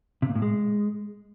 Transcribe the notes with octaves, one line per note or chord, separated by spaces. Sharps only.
C3
A#2
A2
G#3